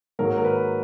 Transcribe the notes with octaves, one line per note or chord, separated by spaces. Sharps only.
G#2 D#3 F#3 A#3 A#4
A#4
B4